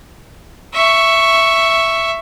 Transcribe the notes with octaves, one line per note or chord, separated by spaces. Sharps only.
E5 C#6